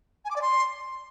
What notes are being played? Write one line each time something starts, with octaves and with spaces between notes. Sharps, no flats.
G#5
D6
D5
C6